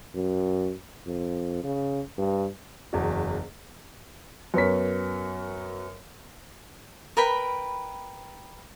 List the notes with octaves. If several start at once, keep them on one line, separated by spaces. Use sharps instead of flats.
F#2
F2
C#3
G2
F#1 E2 F#4
F#2 B3 A#4 C#5 B6
A#4 B4 G5 B5